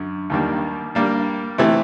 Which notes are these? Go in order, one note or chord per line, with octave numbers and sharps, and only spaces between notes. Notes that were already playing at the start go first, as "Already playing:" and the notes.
Already playing: F#2 D3
D#2 D#3 G3 A#3 D4
G3 A#3 D4
C3 E3 A3